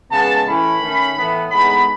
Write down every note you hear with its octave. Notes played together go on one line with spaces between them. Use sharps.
C#3 G#3 B3 A5
A2 E3 A3 C#4 B5
D#3 A3 C#4
A2 E3 B3
A2 G#3 B3 D#4 B5